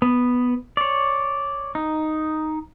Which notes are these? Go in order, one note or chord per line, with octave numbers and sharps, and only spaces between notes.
B3
C#5 D5
D#4